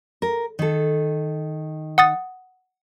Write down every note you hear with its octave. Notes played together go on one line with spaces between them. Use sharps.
A#4
D#3 A4
F#5 D#6 A6